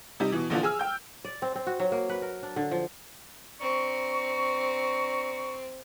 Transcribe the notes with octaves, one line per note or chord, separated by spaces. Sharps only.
C3 G3 D#4
B2 E3
A#1 A#2 D3 E3 F3
G#4 G#5 E6 F6
G5 G6
D5
C4
C4
F#4
F#3
A#3
B4
A#4
D4
D3
F3
C4 D4 A#5 C#6